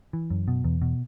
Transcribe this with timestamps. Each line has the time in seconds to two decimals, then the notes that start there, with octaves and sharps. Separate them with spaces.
0.13 E3
0.30 F#2
0.48 B2
0.64 E2
0.82 B2